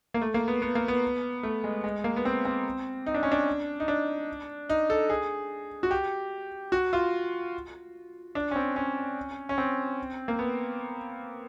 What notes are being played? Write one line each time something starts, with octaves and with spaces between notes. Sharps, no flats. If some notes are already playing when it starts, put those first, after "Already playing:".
A#3
A3
A#3
B3
B3
A#3
B3
A3
G#3
G#3
A#3
B3
C4
C4
D#4
D4
C#4
D4
D#4
D4
D#4
A4
G#4
F#4
G4
F#4
F4
D4
C#4
C4
C#4
C#4
C4
A#3
B3